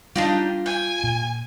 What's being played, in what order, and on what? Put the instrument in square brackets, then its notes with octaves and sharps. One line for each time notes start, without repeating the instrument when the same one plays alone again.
[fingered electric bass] G3 [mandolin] D4 D#4 G4 [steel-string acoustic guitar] F4
[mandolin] G5 [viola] G#5
[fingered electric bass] A#2